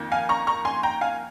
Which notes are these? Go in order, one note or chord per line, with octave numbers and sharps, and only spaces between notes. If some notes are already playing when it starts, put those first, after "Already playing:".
Already playing: F2 D#3 A#3
F5 G#5
A#5 C#6
A#5 C#6
G#5 C6
G5 A#5
F5 G#5